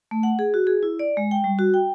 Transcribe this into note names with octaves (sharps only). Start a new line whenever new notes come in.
A3
F#5
G#4
F#4
G#4
E4
D5
G#3
G5
G3
F#4
G5